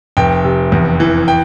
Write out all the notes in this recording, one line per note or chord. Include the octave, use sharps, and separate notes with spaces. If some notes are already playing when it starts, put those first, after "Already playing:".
F1 G5
C3
E2
E3
G5